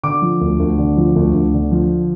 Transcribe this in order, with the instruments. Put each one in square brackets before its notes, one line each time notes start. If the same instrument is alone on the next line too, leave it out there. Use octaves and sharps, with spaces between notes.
[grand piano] D3 D6
F3
D2
D2
D3
F3
D2
D2
D3
F3